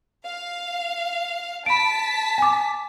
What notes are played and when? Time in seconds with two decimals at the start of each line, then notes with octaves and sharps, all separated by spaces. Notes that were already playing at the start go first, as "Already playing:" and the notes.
0.24 F5
1.66 A5 B5 B6 D7
2.38 G#5 D6